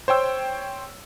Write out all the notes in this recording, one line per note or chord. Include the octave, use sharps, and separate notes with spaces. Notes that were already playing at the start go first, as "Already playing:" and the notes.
C5 C#5 G5 E6